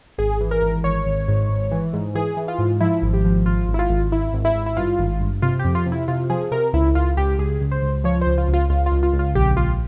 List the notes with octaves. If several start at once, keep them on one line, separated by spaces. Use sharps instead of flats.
G#1 G#4
E3
A#4
G#1
G#1 C#5
G#1
G#2
G#1
E3
G#2
E3 G#4
E3
F4
G#2
F3 E4
G#1
G4
F3
G#1 F4
G#1
E4
F4
G#1
G#1 E4
G#1
E4
G#1
E4
G2 F4
G#1
G2
C3 F4
F2 G4
F4
C3
E4
C3 F4
F3 G#4
C3 A#4
C#2 E4
C#2 F4
C#2 G4
C#2 G#4
C#2
C5
C#2
F3 C#5
C5
C#2
F4
C#2
F4
C#2 F4
F4
C#2
F4
C#2
F4
A#1 G4
A#1 F4